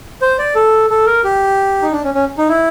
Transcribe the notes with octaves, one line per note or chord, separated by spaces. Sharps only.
C5
D5
A4
A4
A#4
G4
D#4
D4
C#4
C#4
D#4
E4